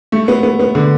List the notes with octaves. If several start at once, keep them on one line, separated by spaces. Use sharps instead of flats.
A3
B3
B3
B3
D3